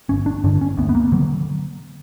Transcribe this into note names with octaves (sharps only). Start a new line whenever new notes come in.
G1 C#4
D4
G2 D3 D4
C#4
D2 B3
B3
A#3
D3 F#3